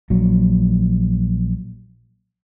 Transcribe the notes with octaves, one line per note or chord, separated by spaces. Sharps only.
A#1 F#3